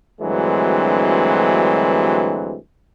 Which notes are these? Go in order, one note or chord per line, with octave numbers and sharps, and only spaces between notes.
D2 G2 E3 F#3 G#3 C4